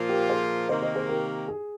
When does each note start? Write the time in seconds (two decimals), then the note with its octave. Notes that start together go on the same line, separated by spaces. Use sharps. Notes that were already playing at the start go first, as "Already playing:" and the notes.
Already playing: A#2 F3 A#3 F4
0.09 G4 A#4
0.29 G#4 C5
0.69 C3 D#3 A#3 C5 D#5
0.82 C5 D#5
0.95 G#4 C5
1.08 G4 A#4
1.48 G#4